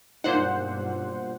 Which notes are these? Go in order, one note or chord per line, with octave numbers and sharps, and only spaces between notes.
B1 G2 A#2 D#4 C5 F#5